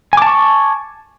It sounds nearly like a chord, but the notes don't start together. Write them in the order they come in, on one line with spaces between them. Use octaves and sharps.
G#5 D6 A5 C#6